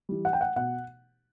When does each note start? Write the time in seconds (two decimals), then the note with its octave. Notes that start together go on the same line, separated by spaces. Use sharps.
0.09 E3 G3
0.25 F#5
0.33 G5
0.41 F#5
0.56 B2 F#5